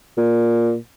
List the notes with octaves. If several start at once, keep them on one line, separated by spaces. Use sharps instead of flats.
A#2